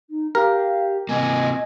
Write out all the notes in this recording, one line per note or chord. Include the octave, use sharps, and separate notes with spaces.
D#4
G4 A#4 F5
C3 A#3 D#5 G#5